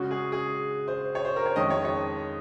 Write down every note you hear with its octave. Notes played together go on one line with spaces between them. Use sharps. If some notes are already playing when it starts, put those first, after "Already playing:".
Already playing: C#3 G#3 C#4 F#4
G#4
G#4
C5
C#5
C5
A#4
C#5
F2 D#3 G#3 C#4 D#5
C#5
C#5